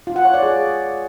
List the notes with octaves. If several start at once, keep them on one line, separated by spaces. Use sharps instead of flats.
F4
F#5
C#5
D5
G#4